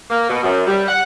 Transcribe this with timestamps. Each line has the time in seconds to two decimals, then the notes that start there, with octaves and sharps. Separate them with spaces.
0.10 A#3
0.29 B2
0.43 F#2
0.66 G3
0.88 F#5